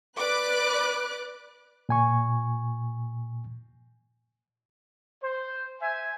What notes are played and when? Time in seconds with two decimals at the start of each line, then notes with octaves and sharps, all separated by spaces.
0.19 B4 D5 D6 F#6
1.89 A#2 G#5 C#6
5.22 C5
5.81 C5 E5 G#5